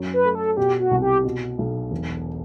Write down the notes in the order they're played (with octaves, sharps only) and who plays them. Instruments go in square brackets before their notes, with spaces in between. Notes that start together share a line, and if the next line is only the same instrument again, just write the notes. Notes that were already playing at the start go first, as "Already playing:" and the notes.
Already playing: [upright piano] F#2
[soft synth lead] B4
[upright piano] A3
[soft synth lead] A4
[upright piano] B2 [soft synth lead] G4
[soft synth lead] F#4
[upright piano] C2
[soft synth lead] G4
[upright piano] B2
B1
E1